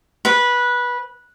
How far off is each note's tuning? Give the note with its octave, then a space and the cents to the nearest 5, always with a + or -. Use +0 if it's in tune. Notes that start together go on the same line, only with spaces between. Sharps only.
B4 -15